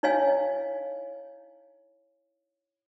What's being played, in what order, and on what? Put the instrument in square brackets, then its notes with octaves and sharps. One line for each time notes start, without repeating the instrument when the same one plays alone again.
[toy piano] D#4 E4 C#5 D#5 F5 G#5